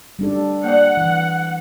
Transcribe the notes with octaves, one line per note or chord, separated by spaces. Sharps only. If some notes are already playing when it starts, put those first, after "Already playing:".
G3 D4 A4
A#3 D5 F#5
E3